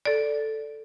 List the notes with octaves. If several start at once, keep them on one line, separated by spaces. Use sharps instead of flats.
A4 D5